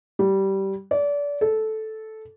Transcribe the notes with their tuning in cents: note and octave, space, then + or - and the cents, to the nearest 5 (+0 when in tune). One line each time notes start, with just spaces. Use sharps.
G3 -15
D5 -30
A4 -10